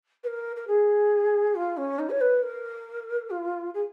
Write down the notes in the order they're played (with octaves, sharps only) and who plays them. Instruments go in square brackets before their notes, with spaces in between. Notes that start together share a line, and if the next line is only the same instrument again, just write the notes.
[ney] B4
A#4
A#4
G#4
F4
C#4
D#4
C#5
B4
A#4
F4
G#4